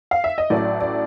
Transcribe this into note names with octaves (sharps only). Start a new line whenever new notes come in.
F5
E5
D#5
A1 A2 F#3 A3 D5
D5